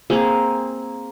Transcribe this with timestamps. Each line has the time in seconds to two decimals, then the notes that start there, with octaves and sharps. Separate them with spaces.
0.10 A#3 C4 G#4